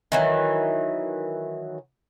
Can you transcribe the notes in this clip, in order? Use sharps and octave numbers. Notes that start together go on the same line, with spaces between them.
D#3 E3 F#3